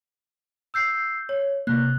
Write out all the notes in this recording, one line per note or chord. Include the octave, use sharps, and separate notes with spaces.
E6 G6 C7
C#5
C3 A#3 F#6